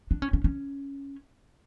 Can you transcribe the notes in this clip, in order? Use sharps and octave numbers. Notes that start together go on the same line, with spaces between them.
D4
C#4
C#4
C#4